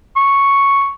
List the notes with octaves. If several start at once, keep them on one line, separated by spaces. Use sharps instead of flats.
C#6